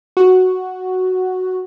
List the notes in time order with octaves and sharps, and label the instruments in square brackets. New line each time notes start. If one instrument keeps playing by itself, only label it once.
[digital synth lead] F#4